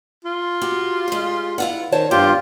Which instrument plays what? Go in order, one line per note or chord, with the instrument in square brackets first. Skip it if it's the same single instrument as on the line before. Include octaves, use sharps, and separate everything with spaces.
[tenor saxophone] F4
[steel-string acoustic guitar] F#4 G4
G#3 G4
E4 F4 F#5
[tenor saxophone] D#3 [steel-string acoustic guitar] C5 C#5 A5
[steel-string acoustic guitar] E2 [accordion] G2 F4 [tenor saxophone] G4